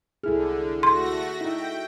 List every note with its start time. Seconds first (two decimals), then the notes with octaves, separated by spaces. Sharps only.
0.23 C2 D3 E4 G#4 A4 F6
0.83 A3 F#4 C6 A#6
1.41 D#4 E4 E5 G5